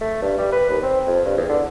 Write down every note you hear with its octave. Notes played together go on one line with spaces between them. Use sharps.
A3
G2
G3
B4
D#2
C4
F2
G2
E2
D3